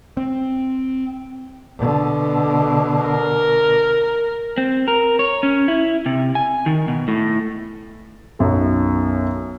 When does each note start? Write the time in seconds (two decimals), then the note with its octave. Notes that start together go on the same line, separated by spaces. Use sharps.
0.17 C4
1.78 B2 D3
3.05 A#4
4.58 C4
4.88 A#4
5.19 C#5
5.43 C#4
5.68 E4
6.06 C3
6.35 G#5
6.66 D#3
6.88 B2
7.08 A2
8.39 B1 F#2 A4